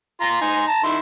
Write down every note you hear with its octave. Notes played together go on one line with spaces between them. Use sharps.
F4 A#5 C6
D#4 G#5 C6
A5 A#5
D#3 E4 C6